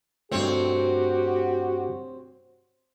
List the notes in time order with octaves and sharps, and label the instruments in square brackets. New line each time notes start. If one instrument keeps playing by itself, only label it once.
[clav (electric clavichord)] G2 A3 [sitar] C4 C#5 [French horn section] F#4 G4